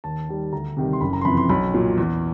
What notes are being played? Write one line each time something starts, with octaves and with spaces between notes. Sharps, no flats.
D#2 A5
D#3 G3
D2 A#5
C3 D#3 G3
C6
F#1 B5
A#5
C6
F2 C3 E3 B5
C6
B1 B5
A#2 F#3
E2